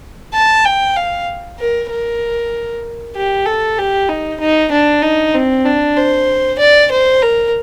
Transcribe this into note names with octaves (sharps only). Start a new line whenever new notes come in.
A5
G5
F5
A#4
A#4
G4
A4
G4
D#4
D#4
D4
D#4
C4
D4
C5
D5
C5
A#4